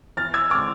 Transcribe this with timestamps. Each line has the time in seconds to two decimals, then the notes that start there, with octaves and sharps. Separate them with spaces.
0.17 E2 F6 A6
0.34 E6 G#6
0.50 D3 G#3 C4 D6 F6